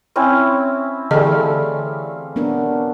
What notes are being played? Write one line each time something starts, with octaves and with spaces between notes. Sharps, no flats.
C4 C#4 E4
D3 E3 G3 A3 G#4 A4 D#5 F5
B3 D4 A#4